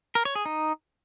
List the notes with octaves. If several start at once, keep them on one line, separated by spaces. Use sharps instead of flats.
A#4
C#5
G#4
D#4